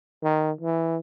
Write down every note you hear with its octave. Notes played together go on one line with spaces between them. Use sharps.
D#3
E3